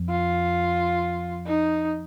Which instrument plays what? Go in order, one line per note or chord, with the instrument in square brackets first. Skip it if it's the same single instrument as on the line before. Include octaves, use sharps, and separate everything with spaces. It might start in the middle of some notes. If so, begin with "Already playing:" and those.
Already playing: [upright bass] F2
[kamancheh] F4
D#4